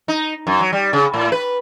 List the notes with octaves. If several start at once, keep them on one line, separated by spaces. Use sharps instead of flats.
D#4
F#2
F#3
G3
C#3
A2
B4